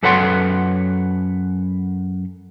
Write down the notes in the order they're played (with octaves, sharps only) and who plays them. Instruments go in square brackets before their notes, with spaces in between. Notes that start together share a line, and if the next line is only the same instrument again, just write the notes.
[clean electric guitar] F#2 A4 B4 C#5 F#5 C6